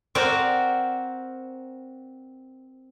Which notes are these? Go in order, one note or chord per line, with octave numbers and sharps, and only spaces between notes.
C4 F#4 A#4 C5 D5